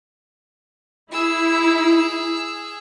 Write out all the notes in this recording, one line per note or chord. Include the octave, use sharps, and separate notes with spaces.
E4 G#4 E6